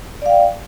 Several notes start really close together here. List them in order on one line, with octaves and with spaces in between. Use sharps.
D5 F5 G5